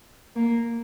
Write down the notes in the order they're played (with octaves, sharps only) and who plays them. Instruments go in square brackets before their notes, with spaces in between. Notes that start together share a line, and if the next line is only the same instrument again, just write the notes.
[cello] A#3